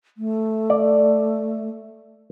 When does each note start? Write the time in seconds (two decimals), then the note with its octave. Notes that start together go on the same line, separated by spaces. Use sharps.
0.18 A3
0.70 D5